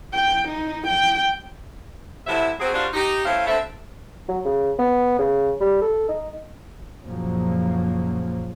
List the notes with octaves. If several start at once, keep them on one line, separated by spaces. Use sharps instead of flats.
G5
D#4
G5
A2 C3 F#3 E4 E5
F#3 C4 G#4
G3 D4 F4 F#4 A#4 C5
D#4 G4
A3 C4 C#4 E4 F5
D3 B3 C4 A4 E5
F#3
C#3
B3
C#3
G3
A4
D#4
F#2 A#2 C#3 F3 A#3